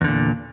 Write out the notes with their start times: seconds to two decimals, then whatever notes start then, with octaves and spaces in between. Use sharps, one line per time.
0.01 E2
0.04 D3
0.08 A#2